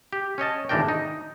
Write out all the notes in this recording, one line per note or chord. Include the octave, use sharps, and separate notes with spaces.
G4
C#4 C#5 D#5 A5
G#1 E3 A3 D4 A#4 G5
D#4